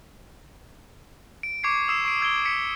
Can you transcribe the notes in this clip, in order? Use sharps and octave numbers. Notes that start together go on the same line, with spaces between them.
D7
C#6 D6 G#6 C7 C#7
D#6 E6 C7 E7
C#6 C7 D7
E6 G#6 D7 G7
B6 C#7